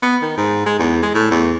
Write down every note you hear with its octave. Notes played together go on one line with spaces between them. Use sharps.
B3
D#3
G#2
G#3
E2
G#3
A2
E2